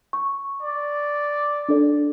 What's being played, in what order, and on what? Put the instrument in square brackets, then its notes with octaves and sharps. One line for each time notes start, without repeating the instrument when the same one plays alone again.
[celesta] C#6
[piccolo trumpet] D5
[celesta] D4 A4 D5